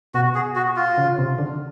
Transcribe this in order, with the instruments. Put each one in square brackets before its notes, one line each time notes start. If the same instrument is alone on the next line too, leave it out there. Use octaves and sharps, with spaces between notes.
[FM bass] B2 [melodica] F#4
[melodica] G#4
F#4
F4
[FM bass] C#3
C3
D3